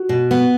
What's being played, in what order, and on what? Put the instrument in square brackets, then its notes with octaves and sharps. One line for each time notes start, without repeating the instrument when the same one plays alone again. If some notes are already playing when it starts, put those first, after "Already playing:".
Already playing: [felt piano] F#4
[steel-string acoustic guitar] B2
B3